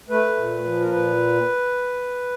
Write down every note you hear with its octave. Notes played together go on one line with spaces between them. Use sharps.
A3 B4
A#2
F3
A#4
A#2 B4